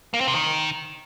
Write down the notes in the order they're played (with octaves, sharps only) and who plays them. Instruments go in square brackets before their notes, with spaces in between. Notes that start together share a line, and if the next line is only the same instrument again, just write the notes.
[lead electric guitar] A#3
C4
C3
D#3